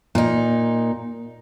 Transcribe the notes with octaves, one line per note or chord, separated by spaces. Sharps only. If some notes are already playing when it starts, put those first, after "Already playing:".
A#2 D#4